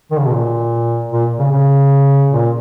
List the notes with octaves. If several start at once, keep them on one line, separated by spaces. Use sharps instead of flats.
D#3
C#3
B2
A#2
A#2
C#3
C#3
A#2